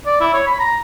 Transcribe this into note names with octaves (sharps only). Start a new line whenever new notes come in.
D5
E4
C#5
B5
A#5